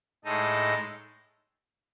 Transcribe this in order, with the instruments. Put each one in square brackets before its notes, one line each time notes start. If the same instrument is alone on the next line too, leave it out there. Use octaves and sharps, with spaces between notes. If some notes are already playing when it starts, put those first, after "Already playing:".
[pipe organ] A2 G#3 D#4 A4 D#5